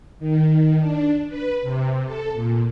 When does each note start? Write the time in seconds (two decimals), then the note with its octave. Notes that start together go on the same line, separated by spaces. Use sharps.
0.19 D#3
0.79 D4
1.28 B4
1.62 C3
2.04 A4
2.33 A#2